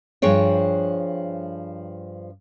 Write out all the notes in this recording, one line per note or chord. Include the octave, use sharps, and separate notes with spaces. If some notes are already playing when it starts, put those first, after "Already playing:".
G2 F3 G#4 C#5 G5